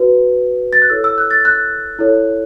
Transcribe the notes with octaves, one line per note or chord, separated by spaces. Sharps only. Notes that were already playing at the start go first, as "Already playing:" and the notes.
Already playing: F#4 B4
A6
F#6
E4 A4 C#5 E6
E6
F#6
A6
F#6
E4 A4 C#5